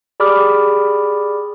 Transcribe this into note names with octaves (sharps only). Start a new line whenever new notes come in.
G4 G#4 D5 B5 D6 F6